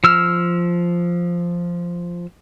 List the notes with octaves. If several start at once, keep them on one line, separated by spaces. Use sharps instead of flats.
F3 E6 F6